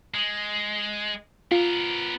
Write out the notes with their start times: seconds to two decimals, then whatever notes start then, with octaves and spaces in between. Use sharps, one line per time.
0.14 G#3
1.52 B3 F4 A#4